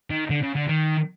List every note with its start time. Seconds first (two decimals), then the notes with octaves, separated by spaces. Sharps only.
0.10 D#3
0.30 D3
0.42 C#3
0.55 D3
0.68 D#3